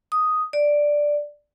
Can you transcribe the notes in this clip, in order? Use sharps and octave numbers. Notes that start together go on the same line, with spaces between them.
D#6
D5